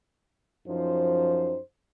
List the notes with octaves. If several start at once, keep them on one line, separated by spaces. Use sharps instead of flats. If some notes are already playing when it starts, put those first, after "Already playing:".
F#2 F3 D#4 C5